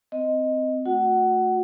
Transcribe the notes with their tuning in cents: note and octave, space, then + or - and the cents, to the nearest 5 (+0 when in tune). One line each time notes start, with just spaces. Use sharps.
C4 -15 D#5 +0
A3 +0 F#4 -30 F#5 +20